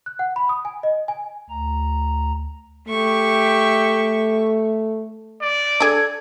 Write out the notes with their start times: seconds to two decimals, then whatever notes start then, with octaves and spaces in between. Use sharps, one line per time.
0.06 F#6
0.19 F#5
0.36 B5
0.49 D#6
0.65 G#5
0.83 D#5
1.08 G#5
1.50 D2 A#5
2.89 A3 G4 E5 C#6
5.41 D5
5.80 D4 G#4 A4 G#6